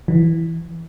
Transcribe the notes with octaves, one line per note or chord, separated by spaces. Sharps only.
E3